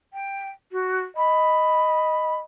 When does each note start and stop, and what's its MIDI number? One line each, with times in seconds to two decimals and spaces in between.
0.13 0.49 79
0.72 1.00 66
1.17 2.44 75
1.17 2.36 83